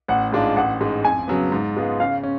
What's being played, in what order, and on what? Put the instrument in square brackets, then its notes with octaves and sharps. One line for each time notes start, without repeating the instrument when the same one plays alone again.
[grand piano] A1 [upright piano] F#5
[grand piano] G#2 G#3 D4 F4
[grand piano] A1 [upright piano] F#5
[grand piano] G#2 G#3
[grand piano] F2 [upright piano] G#5
[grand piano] C#3 F#3 B3
G#2
G#3 B3 F4 G#4
[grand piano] C#3 [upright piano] F5
[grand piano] C#4